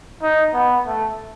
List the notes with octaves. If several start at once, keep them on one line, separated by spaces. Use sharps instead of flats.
D#4
B3
A3